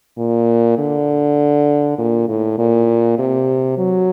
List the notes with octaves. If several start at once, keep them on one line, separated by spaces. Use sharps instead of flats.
A#2
D3
A#2
A2
A#2
C3
F#3